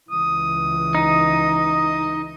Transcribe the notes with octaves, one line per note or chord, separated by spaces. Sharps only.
C#2 E3 D#6
D#4